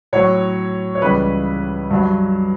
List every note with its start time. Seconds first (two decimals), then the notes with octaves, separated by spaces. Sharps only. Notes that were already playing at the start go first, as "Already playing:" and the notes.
0.13 A2 F#3 C#5
0.95 C#5
1.01 C#2 C#3 E3 G3 B4
1.91 G2 F#3